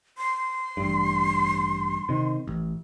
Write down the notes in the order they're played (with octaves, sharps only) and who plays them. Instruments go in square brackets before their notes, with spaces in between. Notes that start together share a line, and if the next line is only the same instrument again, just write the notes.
[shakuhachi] C6
[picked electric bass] A1 G2
C3 D#3
A1